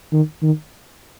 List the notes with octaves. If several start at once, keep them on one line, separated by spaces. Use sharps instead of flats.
D#3
D#3